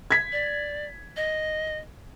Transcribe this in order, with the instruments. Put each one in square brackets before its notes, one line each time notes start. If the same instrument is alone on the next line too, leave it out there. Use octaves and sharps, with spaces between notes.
[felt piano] G#6 B6
[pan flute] D5
D#5